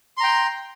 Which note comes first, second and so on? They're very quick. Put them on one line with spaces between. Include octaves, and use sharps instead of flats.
C6 A#5 G5